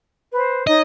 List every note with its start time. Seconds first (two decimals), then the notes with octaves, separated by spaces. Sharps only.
0.34 B4 C5
0.67 D#4 C#5 D#5